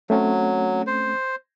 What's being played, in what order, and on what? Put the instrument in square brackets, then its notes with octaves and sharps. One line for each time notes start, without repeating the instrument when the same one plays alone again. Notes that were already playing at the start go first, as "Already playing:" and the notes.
[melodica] F#3 [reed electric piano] A3 C4 C#4
[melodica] C5